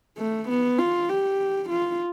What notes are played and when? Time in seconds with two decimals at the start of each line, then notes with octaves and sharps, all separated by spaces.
0.18 A3
0.49 B3
0.79 F4
1.09 G4
1.70 F4